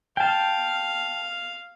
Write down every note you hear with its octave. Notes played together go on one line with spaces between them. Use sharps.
F5 G5 A5